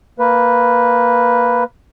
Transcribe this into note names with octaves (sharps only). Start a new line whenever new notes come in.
A#3 B4